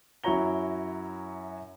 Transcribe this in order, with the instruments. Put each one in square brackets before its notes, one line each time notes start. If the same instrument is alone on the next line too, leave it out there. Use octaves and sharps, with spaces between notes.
[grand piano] F#2 E4 F#4 C#5 A#5 G7